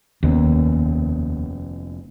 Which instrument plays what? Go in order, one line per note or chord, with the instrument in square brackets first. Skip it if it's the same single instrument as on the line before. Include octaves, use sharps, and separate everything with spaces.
[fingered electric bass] F1 B3 C#4 [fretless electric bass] D#2